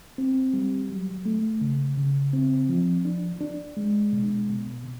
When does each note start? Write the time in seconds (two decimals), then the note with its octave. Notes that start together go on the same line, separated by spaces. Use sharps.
0.18 C4
0.54 G3
0.90 F#3
1.25 A3
1.61 C#3
1.97 C#3
2.33 C4
2.69 F3
3.05 D4
3.41 D4
3.77 G#3
4.13 B2
4.49 B2
4.84 B2